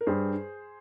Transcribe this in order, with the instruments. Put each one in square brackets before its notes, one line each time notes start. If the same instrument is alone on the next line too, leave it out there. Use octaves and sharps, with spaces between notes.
[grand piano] A#4
[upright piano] G2 [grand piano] G#4 C5